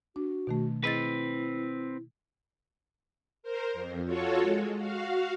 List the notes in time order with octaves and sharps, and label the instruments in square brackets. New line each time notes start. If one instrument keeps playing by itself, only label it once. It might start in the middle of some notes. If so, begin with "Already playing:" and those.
[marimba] D4 [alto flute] F#4
[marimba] B2 D#3 A3
[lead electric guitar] C4 B4 [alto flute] E4 [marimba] G#4 D#5 A6
[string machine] A#4 C5
F2
F4 F#4 A4 C#5
G#3
F#4 F5